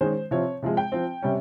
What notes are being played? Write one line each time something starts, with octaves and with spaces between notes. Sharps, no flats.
D#3 G#3 C#4 C5
C3 F3 C4 C#5
C3 F3 G#3
G5
F3 C4
C3 G3 C#4